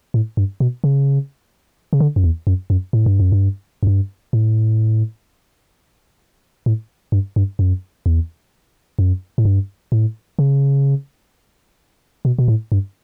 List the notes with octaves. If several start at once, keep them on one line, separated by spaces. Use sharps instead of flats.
A2
G2
B2
C#3
C#3
D3
F#2
E2
F#2
F#2
A2
G2
F#2
G2
F#2
G2
A2
A2
G2
G2
F#2
E2
F#2
A2
G2
A2
C#3
B2
B2
A2
G2